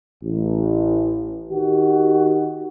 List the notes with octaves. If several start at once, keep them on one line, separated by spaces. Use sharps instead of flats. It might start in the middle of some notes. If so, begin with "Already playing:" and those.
A1
D#3 F#4 G4